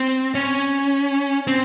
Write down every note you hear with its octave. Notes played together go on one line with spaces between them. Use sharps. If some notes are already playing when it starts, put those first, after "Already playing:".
Already playing: C4
C#4
C4